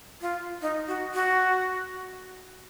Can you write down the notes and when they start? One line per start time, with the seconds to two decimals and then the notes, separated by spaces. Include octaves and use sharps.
0.21 F4
0.61 D#4
0.87 F#4
1.14 F#4